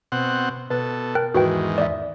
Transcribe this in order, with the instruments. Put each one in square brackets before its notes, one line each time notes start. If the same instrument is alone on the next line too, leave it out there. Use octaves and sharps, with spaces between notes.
[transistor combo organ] B2 C4 F#5
[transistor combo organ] B2 A4 [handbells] B4
[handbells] A#4 G5 F#6
[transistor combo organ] E2 G#2 D#3 [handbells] F#4 B4 G5
[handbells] D5 E5